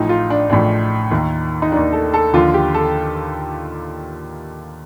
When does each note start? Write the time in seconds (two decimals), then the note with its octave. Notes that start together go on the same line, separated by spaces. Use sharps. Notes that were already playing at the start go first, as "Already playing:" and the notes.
Already playing: A1 A2 F3 D#4
0.09 F4
0.30 D4
0.50 A1 A2 F3 D4
1.11 D#2 D#3
1.62 D#4
1.72 D#2 D#3 D4
1.93 A4
2.14 A4
2.33 D#2 D3 F3 F4
2.54 G4
2.74 A4